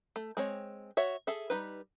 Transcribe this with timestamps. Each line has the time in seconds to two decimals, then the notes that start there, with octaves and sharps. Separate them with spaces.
0.16 A3
0.37 G#3 C4 C#5
0.97 F#4 C#5 E5
1.27 G#4 A4 E5
1.50 G3 D#4 B4